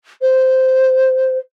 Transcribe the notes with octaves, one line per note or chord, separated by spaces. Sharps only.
C5